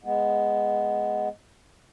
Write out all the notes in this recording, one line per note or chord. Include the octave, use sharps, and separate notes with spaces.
G#3 B3